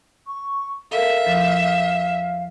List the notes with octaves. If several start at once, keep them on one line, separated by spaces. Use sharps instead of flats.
C#6
A4 A#4 E5 F5
E2 F3